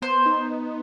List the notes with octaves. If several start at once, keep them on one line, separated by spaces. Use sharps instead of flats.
B3 C5
D#4